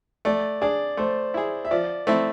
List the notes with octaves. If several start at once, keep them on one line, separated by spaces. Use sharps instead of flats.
A3 D5
D4 G#4 D5
A3 C5
E4 G#4
E5
F3 D5
A3 C4 E4